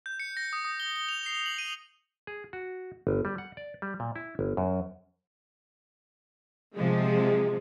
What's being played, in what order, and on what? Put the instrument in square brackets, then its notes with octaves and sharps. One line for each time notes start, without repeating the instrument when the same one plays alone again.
[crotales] G6
C#7
A#6
D#6
D#6
G7
G7
F7
C7
F#7
D#7
[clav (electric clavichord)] G#4
F#4
G1
G3
F#5
D5
G3
A#2
E4
G1
F#2
[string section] C3 F3 G#3